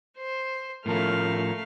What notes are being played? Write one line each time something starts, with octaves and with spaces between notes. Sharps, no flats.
C5
A2 F3 A3 C#4 A#4 F5